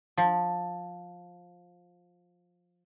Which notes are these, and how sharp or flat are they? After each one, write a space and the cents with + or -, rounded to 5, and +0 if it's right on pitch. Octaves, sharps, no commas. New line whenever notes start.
F3 +15